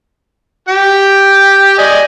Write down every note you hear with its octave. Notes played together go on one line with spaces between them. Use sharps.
G4 G5
D5 D#5 G#5